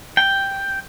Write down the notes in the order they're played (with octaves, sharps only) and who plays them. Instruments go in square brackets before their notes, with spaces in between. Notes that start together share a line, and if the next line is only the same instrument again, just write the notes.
[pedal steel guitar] G5